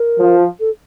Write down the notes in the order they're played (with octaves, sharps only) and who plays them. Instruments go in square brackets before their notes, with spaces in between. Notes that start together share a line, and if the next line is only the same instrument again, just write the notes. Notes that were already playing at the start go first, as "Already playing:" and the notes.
Already playing: [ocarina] A#4
[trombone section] F3
[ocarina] A4